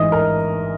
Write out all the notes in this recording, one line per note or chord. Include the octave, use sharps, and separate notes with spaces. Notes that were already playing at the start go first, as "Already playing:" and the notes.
Already playing: A1 G#2 E3 D#5 D#6
A#4 A#5